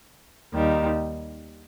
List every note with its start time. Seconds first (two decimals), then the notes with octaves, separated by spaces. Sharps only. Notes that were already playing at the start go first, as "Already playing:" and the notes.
0.53 D#2 D#3 G3